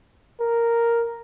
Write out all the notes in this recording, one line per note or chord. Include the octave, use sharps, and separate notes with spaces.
A#4